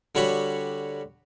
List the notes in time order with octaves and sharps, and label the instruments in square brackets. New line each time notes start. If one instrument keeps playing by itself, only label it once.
[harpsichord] D3 G3 F#4 C#5 B5 C#6